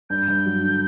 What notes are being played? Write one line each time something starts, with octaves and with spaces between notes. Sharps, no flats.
G2 G6
G2
F#3
D3